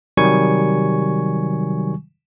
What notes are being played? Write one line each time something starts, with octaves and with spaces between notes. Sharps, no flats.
C3 D#3 F#3 G3 G#5 C#6